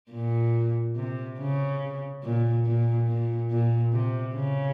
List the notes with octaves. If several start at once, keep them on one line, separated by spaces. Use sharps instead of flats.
A#2
C3
C#3
A#2
A#2
A#2
A#2
C3
C#3